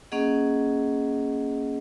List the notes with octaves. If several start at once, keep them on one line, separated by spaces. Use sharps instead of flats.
A#3 C#4 G#4 D#5 F#5